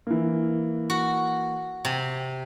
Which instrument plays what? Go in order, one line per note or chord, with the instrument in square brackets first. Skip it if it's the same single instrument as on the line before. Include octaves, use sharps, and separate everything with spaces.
[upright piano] E3 A#3
[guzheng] F#4
C3